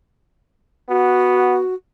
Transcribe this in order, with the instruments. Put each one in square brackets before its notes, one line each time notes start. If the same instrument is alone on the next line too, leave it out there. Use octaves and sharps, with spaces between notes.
[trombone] B3 [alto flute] F#4